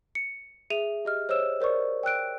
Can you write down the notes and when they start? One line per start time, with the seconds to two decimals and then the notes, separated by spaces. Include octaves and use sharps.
0.15 C#7
0.70 G#4 E5 D#7 F7
1.05 G4 D#5 F6
1.29 C5 C#5 D#5 E6 E7
1.61 A#4 C5 D5 C#6
2.03 G5 E6 F#6 D7